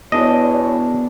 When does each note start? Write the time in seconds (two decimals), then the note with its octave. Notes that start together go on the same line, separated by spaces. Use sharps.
0.12 E2 B2 D4 C#5 D#5